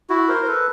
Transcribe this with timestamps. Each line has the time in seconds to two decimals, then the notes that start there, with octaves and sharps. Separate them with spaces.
0.09 E4 F#4
0.28 A#4 C5
0.42 C5
0.47 A4 B4